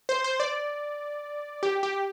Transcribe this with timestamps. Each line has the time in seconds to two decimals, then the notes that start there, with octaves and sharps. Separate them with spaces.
0.09 C5
0.24 C5
0.40 D5
1.63 G4
1.83 G4